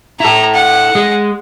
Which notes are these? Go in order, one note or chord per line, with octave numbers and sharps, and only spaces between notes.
E4 A4 A#5
F#5
G#3